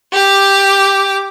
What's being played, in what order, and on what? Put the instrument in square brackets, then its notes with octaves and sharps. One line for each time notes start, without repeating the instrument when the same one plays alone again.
[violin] G4 D6